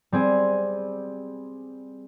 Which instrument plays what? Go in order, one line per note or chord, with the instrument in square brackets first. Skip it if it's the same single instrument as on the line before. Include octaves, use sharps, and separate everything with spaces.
[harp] G3 C4 G#4